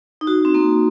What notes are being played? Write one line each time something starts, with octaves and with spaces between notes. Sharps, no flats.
D#4
F#4
C4
A#3